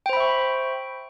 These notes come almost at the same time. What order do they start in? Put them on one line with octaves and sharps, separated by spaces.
G5 C5 B5 E5 C#6